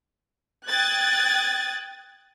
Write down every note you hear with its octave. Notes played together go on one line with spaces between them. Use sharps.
G5 D#6 F#6 G#6 A6